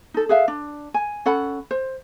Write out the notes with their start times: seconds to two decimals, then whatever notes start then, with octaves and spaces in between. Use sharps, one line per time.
0.14 D#4 A4
0.29 G#4 B4 E5 F5
0.48 D4
0.94 G#5
1.26 C#4 A4 F#5 B5
1.71 C5